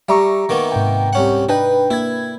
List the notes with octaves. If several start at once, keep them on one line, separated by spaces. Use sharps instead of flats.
G3 E5 A#5 C#6
D#3 A#3 B3
G#2 C3 G5
C2 C#4 F#5
D4 D#4 B4 G5
A#3 E4 G#6